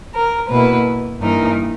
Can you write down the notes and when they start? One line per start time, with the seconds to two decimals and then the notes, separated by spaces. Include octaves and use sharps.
0.14 A#4
0.50 B2 A#3 E4 B4
1.22 G2 E3 A#3 D#4 A#4